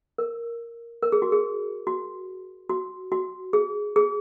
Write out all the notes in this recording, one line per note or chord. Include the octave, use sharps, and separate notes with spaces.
A#4
A#4
G#4
F#4
G#4
F#4
F#4
F#4
G#4
G#4